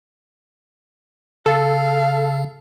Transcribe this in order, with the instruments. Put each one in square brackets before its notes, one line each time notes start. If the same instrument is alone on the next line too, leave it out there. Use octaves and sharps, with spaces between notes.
[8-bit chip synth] C#3 [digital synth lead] A4 [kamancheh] F5